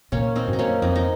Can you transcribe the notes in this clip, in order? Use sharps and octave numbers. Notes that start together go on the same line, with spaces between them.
A#2 A#3 C#4
C4 D#4
F#2
D#4
A#3 C#4
F2 C4 D#4
D#4